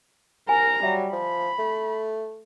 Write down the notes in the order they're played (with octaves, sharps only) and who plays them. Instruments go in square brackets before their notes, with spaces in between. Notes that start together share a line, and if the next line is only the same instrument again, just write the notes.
[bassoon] C2 [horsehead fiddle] A#4 A#5 [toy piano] G#5
[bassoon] F#3 [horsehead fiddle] G3 [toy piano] E5
[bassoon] F3 [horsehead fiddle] B5
[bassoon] A3